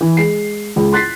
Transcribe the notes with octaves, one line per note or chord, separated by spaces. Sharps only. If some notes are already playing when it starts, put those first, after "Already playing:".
E3
G#3 C7
C#2
C6 F#6 A6 B6 C7